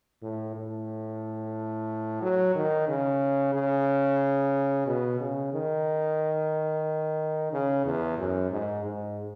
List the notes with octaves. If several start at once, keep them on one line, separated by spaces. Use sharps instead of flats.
A2
A2
F#3
D#3
C#3
C#3
B2
C#3
D#3
C#3
E2
F#2
G#2
G#2